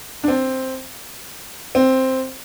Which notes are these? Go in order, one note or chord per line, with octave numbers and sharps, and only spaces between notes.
D4
C4
C4